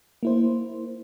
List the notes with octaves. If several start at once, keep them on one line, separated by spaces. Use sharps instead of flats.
A#3 E4 C5